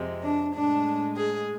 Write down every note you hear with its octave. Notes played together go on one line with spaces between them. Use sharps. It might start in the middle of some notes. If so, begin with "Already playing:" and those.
Already playing: F2 C3 G#3
D4
A2 G#3 D4
G#4